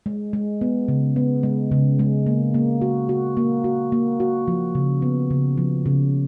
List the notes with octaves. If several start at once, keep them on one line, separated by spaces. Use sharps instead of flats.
G#3
G#3
B3
C#3
B3
G#3
C#3
G#3
A#3
A#3
F#4
F#4
A#3
F#4
A#3
F#4
F3
C#3
B3
C#3
F3
C#3